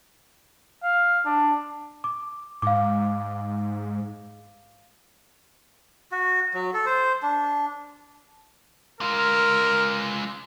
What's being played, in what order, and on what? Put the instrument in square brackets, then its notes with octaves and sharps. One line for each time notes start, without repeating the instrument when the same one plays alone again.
[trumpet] F5
D4
[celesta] D6
[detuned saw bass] G#2 [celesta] F5 D6
[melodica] F#4
F#3
A4
C5
D4
[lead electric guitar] G#3 F4 [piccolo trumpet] A#4